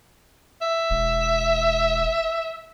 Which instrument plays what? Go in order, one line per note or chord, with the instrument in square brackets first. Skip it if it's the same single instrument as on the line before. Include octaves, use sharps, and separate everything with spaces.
[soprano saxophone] E5
[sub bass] E1